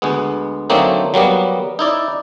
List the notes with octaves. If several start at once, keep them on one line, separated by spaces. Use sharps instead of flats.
D2 G#3 B3
D3 F#3 A3 A#3 C4 D#4
F#3 G3 A#3 B3
D#4 E4 D5